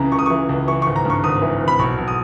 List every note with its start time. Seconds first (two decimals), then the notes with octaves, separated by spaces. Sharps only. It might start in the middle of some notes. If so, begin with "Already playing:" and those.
Already playing: C#2 C#3 E3 A#5
0.12 C#2 C#6
0.19 D#6
0.26 E3 C#6
0.49 C#2
0.67 E3 C#6
0.82 G#1 C#6
0.96 A#5
1.05 G2 C#6
1.24 G#1 D#6
1.42 E3
1.61 G#1
1.68 B5
1.79 B1 C#6
1.98 B1
2.08 D#6